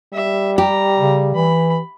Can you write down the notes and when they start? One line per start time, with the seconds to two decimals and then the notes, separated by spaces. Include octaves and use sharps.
0.13 G3 E5
0.58 G4 A#5
0.98 C#3
1.35 E3 B5